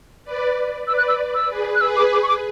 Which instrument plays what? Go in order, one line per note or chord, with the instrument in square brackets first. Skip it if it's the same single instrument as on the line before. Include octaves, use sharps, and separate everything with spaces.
[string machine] B4 D5
[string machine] B4 D5 [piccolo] E6
[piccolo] F#6
E6
E6
[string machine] G#4 B4
[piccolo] F#6
[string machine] G#4 B4 [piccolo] E6
[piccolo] D6
D6
C#6
D6